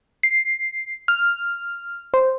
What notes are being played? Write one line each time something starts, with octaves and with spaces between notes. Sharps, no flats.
C7
F6
C5